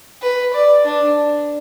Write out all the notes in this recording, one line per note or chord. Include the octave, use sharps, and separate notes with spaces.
B4
D5
D4